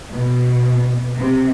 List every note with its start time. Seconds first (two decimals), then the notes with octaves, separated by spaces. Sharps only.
0.12 B2
1.18 C3